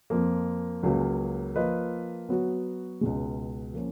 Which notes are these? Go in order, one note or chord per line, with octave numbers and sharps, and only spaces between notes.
F2 F3 A#3
C#2 C#3 F#3 A#3
F3 A#3 F4 B4 D#5
F#3 B3 F#4
C#2 B2 G#3
F3 A#3 C#4